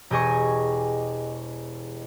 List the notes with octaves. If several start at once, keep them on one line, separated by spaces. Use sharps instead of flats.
E1 G4 G#4 D#5 G#5 C#6